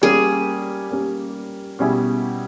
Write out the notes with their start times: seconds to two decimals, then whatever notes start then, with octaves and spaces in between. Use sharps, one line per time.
0.02 G3 A#3 C#4 G4 G#4
0.90 G3 A#3 C#4 G4
1.79 B2 G3 C#4 E4 G#4